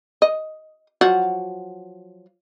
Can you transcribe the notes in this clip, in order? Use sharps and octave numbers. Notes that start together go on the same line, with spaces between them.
D#5
F3 F#3 F#4